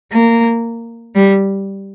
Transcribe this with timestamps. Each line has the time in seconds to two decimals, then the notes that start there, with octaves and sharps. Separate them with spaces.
0.12 A#3
1.15 G3